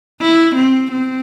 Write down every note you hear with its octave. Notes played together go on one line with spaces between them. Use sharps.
E4
C4
C4